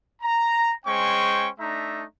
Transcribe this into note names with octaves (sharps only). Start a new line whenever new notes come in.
A#5
G#3 C#4 C5 G5 C#6
A3 D4 D#4 E5 A#5